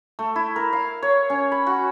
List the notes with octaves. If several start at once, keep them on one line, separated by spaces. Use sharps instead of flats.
A3
E4
A#4
F5
C#5
C#4
B5
F#4